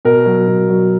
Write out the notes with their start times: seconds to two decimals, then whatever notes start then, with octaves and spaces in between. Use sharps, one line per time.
0.05 B2 A#4
0.26 F#3
0.48 B2
0.70 F#3